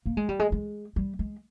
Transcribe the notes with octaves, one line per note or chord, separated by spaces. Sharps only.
A#3
G#3
G3
G#3
G#3
G3
G#3